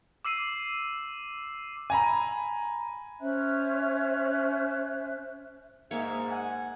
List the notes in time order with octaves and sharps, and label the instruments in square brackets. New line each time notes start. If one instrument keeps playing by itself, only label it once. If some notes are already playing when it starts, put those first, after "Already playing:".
[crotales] D6 E6 C7 D#7
[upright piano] G#5 A#5 B5
[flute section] C#4 C5 E5 F#6
[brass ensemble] G#2 [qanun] A#3 C#5 [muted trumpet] E5
[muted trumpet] F#5 [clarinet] G#5